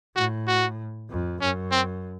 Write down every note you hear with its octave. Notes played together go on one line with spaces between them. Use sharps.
A2 F#4
F#4
F2
F#2 C#4
C4